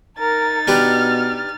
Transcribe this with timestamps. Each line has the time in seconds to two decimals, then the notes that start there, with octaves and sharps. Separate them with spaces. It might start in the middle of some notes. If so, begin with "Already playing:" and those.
0.19 D#4 A#4 A6
0.68 B2 D4 G4 B4 F6